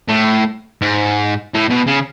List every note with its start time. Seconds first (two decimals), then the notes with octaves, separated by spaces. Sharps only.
0.08 A2
0.81 G#2
1.54 A2
1.70 B2
1.87 C#3